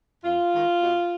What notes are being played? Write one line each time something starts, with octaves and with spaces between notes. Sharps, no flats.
F2 F4
D#3 G#3
B2